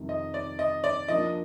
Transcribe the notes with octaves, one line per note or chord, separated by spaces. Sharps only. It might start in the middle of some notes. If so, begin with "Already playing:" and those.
Already playing: F2 C3 D#3 G3
D#5
D5
D#5
D5
F3 A#3 D4 D#5